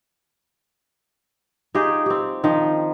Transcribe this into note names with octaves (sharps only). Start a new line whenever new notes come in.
D#4 F4 G4 G#4
C4 G4
D#3 F3